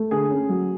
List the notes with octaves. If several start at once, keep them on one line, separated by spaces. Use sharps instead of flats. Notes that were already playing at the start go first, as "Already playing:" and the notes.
Already playing: A3
D3 G#4
C#4
F#3